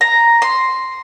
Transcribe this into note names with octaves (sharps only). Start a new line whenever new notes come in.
A#5
C6